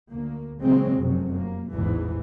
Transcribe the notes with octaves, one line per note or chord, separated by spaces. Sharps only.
D2 A#3
A#2 C#3 E3 F#3 G#3 C4
F1 F#2 C3
A#3
A1 E2 G#2 E3